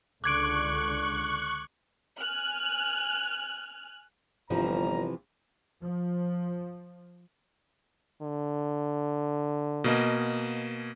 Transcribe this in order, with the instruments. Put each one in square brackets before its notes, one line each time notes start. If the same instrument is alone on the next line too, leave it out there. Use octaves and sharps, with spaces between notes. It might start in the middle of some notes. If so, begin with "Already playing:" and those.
[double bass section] C#2 D3 [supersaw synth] C#6 F#6 [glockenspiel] D6 G#6 D7
[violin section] G#5 F6 F#6
[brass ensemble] G1 A#5 [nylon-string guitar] C3 E3 F3
[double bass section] F3
[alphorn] D3
[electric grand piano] B2 A#3 D#5